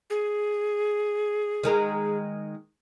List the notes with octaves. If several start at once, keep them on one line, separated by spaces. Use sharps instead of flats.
G#4
D#3 G#3 A#4